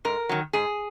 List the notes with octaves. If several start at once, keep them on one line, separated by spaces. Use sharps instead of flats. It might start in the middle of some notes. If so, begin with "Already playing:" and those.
G#2 A#4
D#3 F#3
G#2 G#4